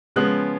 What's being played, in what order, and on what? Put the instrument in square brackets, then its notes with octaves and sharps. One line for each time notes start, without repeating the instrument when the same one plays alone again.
[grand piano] C#3 F3 G#3 B3 F#6